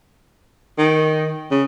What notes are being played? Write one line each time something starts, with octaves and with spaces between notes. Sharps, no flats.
D#3
C#3